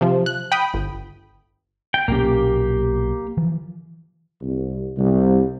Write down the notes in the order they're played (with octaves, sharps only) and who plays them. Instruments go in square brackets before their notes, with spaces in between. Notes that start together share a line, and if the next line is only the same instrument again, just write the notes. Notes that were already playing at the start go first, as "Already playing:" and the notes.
[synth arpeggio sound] C3 F3
F#6
G5 B5 D#6
G1
[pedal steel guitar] G5
[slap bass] B1 A#2 C#4 [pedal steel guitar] A#3 G4
[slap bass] E3 F3
[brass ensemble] C2
C2